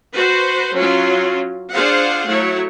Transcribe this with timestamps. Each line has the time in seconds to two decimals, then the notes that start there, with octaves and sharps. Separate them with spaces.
0.14 F#4 B4 C5
0.74 F#3 C#4 F4
1.72 D4 F4 G#4 C5 F5 F#5
2.28 F#3 A3 E4 C#5